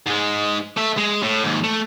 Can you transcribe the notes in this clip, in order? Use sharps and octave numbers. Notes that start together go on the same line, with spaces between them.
G#2 G#3
A3 E5
G#3
A2
D#2 G#2
A3